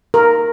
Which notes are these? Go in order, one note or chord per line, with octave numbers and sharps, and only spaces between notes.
A#4